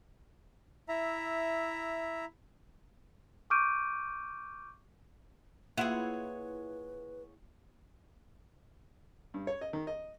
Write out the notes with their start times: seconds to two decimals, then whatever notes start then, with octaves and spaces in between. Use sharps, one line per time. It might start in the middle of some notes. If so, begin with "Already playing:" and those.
0.88 E4 E5 A#5
3.50 C#6 D6 F6 G6 D7 D#7
5.78 A#3 E4 F4 G#4 B4 C#5 F#5
9.34 G2
9.47 C#5
9.61 D#5
9.73 D#3
9.87 D#5